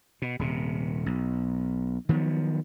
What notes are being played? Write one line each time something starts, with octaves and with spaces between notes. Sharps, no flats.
B2
D#1 C3
B1
D#3 F3 F#3 B3